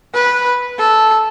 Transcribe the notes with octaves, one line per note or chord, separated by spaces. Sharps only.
B4
A4